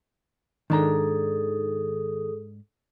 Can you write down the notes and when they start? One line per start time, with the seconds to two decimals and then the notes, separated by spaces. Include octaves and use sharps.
0.70 G#2 D#3 D4 G#4 A4 A#5 D#6